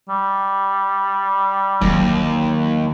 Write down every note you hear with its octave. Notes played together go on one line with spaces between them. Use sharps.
G3
D#2 F#3 A#3